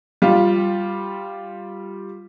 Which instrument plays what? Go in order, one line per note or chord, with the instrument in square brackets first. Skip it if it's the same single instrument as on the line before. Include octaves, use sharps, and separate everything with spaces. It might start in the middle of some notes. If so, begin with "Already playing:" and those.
[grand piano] G3 F4